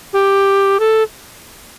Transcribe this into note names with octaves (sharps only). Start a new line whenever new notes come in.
G4
A4